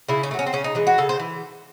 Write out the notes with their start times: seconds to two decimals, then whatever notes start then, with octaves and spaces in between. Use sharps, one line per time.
0.08 C#3 E4
0.23 C#4
0.31 A3
0.34 F#3
0.39 C#4
0.46 C4
0.53 C#3 C#4
0.64 D#4
0.75 E3 G#3
0.87 F#4
0.98 C#3 A4
1.09 C5
1.19 E3